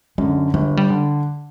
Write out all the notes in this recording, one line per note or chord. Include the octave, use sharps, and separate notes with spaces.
F#2 D3 G#3
G1 G#3
G3
D3